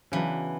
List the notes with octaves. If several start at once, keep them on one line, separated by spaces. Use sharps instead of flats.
C#3 E3 F#3 B3 D4